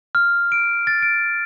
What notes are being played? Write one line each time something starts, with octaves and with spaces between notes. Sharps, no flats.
F6
D7
A6
D7